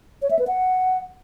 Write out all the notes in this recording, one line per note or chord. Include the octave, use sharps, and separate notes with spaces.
C#5
E5
B4
F#5